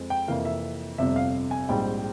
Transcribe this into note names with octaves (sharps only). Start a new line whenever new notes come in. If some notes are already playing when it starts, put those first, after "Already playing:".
Already playing: F2 G#3 C4
G5
F2 C3 E3 A#3 F5
E5
G1 F2 C3 E5
F5
G#5
A#1 G#2 G3 C4 G5